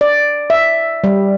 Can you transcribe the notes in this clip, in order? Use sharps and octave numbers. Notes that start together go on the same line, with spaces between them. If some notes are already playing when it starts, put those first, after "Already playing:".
D5
E5
G3